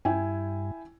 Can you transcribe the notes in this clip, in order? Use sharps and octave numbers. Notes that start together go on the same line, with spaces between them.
G2 E4 G5 G#5